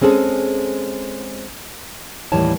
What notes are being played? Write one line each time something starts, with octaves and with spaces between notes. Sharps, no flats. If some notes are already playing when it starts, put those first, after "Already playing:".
G#3 C4 C#4 G#4 A4
D#2 A2 E3 G3 C#5 A5